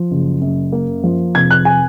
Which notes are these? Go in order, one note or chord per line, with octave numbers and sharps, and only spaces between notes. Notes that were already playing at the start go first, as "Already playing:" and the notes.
Already playing: F3
F#1
F#2
A#3
F3
F1 G#6
F#6
G#5